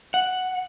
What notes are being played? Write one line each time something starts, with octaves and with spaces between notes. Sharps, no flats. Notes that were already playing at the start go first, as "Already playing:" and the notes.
F#5